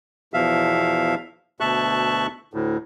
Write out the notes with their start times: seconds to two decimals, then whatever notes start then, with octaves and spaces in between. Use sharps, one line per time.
0.34 E2 B2 F3 E5 F5
1.60 D2 B2 E5 A5 C#6 F#6
2.54 D2 A2